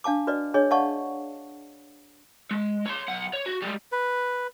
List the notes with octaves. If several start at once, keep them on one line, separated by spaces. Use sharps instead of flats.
D4 F5 A5 D6
F#4 B4 D5 D#5
D4 G#4 C#5 D#5
D5 D#5 F5 F#5 A5 C#6
G#3
C#5 C6
B1 F#5
C#5
F#4
G3 G#3
B4